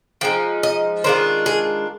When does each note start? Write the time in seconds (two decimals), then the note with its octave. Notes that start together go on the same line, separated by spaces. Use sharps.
0.21 F3 G#3 D#4 G5
0.63 D#5
1.04 D#3 G#3 D4 F4 C5
1.46 G#4